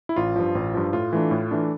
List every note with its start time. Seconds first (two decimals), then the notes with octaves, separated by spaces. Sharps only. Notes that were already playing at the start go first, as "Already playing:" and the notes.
0.09 E4
0.16 A1 F4
0.36 G2 F3
0.55 A1
0.74 G2 F3
0.93 A2 F4
1.13 E3 A3 D4
1.31 A2
1.51 E3 A3 D4